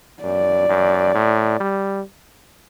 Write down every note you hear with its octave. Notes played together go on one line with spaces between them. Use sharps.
F#2 D5
F#2
A2
G3